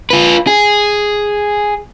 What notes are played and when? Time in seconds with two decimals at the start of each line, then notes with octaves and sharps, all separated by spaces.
0.10 F4 B4
0.47 G#4